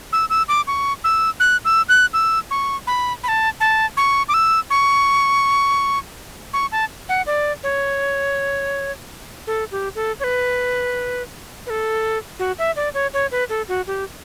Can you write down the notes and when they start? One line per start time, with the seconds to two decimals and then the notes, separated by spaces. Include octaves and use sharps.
0.13 E6
0.30 E6
0.49 D6
0.67 C#6
1.04 E6
1.40 F#6
1.65 E6
1.89 F#6
2.13 E6
2.51 C#6
2.87 B5
3.24 B5
3.28 A5
3.60 A5
3.97 C#6
4.29 D6
4.34 E6
4.70 C#6
6.53 C#6
6.72 A5
7.09 F#5
7.27 D5
7.63 C#5
9.47 A4
9.72 G4
9.95 A4
10.20 C#5
10.24 B4
11.67 B4
11.70 A4
12.39 F#4
12.58 E5
12.76 D5
12.94 C#5
13.14 C#5
13.31 B4
13.49 A4
13.69 F#4
13.87 G4